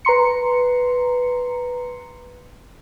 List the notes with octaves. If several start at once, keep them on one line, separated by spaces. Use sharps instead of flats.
B4 A#5 C6 C#7